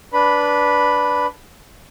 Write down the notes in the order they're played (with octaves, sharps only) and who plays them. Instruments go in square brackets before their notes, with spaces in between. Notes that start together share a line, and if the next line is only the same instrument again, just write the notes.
[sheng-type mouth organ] D4 B4 B5